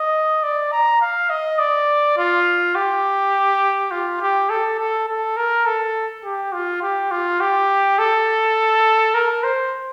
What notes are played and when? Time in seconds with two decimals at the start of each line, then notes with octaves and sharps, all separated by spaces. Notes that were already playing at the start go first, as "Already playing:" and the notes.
Already playing: D#5
0.43 D5
0.72 A#5
1.01 F5
1.30 D#5
1.59 D5
2.17 F4
2.75 G4
3.91 F4
4.21 G4
4.50 A4
4.79 A4
5.08 A4
5.37 A#4
5.66 A4
6.24 G4
6.53 F4
6.82 G4
7.11 F4
7.41 G4
7.99 A4
9.15 A#4
9.44 C5